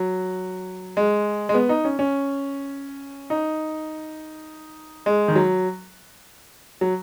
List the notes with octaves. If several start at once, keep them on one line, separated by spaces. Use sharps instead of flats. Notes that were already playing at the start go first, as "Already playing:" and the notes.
Already playing: F#3
G#3
G#3
B3
D#4
C#4
C#4
D#4
G#3
D#3
F#3
F#3